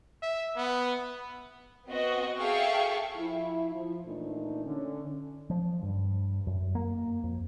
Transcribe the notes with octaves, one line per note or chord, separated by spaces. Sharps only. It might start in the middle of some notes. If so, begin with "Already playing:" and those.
E5
B3
B3 C4 F#4 D#5
G#4 A4 E5 F5 G5 C#6
F3 E4
F3
A#2 E3 A3 D4 D#4
D3 C#4
F3
G2
F#2
A#3
F2